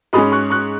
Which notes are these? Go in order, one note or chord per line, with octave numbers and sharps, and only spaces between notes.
G#2 G#3 C#4 B5 D#6
C#6 F#6
C#6 F#6